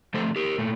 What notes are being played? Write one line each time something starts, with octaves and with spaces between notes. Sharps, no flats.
D3 F3 A3 A4 C5
G4 A#4
A#2 A3